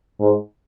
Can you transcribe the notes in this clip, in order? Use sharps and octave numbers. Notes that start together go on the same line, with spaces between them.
G#2